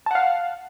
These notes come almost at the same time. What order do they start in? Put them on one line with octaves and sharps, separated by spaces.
A5 F#5 F5